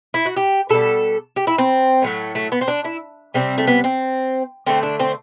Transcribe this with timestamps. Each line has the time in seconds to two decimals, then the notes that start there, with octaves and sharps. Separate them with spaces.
0.14 E4
0.26 F#4
0.37 G4
0.69 B2 G3 A4
1.36 G4
1.47 E4
1.58 C4
2.02 A2 F#3 A3
2.35 A3
2.52 B3
2.61 C4
2.68 D4
2.85 E4
3.34 C3 G3 C4
3.58 A3
3.67 B3
3.84 C4
4.66 D3 A3 C4
4.83 D4
5.00 C4